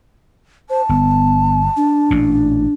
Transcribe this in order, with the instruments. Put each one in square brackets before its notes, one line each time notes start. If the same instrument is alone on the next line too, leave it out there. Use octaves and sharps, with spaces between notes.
[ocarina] C5 [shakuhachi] A5
[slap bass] G1 [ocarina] B3
[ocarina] D4
[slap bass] A1 A#2